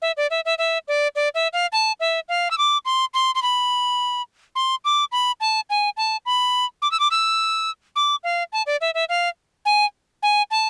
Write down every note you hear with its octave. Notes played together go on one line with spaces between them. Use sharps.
E5
D5
E5
E5
E5
D5
D5
E5
F5
A5
E5
F5
E6
D6
C6
C6
C6
B5
C6
D6
B5
A5
G#5
A5
B5
D6
E6
D6
E6
D6
F5
A5
D5
E5
E5
F5
G#5
G#5
A5